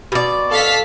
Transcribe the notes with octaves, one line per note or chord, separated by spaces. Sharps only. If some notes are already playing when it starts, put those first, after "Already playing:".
B2 D5
A4 F5 B6